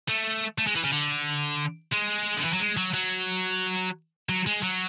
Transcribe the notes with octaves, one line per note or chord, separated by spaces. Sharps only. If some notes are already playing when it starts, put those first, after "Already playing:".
A3
A3
G#3
E3
C#3
D3
G#3
D3
E3
F#3
G#3
F#3
F#3
F#3
G#3
F#3